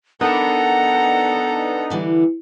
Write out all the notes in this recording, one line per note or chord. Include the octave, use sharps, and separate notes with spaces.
B3 D4 D#4 A4 A#4 F#5 A#5
D3 E3 G3